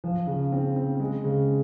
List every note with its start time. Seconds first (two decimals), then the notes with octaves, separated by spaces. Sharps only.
0.04 F3
0.27 C#3
0.52 C4
0.76 C4
1.00 G#3
1.24 C#3